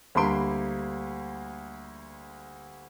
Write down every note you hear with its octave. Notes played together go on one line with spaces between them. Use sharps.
D2 G3 A#3 B5 C6 D7